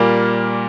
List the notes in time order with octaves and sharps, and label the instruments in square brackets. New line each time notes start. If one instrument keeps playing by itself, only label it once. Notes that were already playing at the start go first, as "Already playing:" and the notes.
Already playing: [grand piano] A#2 G3 A#3